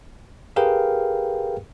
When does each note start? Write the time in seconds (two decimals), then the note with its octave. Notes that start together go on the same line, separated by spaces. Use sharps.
0.56 G4 G#4 A#4 B4 F5 G5